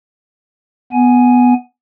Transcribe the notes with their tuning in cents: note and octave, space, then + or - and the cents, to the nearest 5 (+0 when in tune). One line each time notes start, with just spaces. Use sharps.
B3 +0 G#5 +5